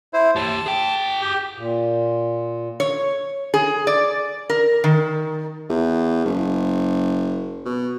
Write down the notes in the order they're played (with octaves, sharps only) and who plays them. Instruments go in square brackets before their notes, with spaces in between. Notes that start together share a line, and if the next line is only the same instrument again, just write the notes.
[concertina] E4 C5
[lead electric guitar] G4 C#5 [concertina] A5
[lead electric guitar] G#4 G5
[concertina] G4
[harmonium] A#2
[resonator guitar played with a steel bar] C#5
G#4
D5
A#4
D#3
[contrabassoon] E2
F#1
B2